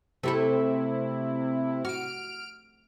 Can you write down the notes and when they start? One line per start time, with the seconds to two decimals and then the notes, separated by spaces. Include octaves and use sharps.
0.23 C3 A3 C4 E4 A4
1.85 F#4 F6 D7